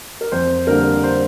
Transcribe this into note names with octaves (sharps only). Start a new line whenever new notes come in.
A#4
F2 C5
D3 G3 A#3 A#4
C5